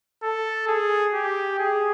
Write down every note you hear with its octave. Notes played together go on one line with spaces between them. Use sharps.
A4
G#4
G4
G#4